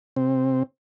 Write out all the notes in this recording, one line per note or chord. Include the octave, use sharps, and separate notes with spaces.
C3 C4